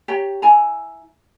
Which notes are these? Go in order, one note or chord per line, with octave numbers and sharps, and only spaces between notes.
G4 C#5 G5 A#5
E4 G#5 A#5